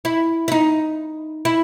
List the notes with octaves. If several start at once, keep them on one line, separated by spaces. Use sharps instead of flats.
E4
E4
D#4
E4